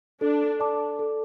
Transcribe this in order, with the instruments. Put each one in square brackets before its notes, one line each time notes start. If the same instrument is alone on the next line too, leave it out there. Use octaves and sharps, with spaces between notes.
[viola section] D4 [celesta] A4
[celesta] D5 A5 D6
A4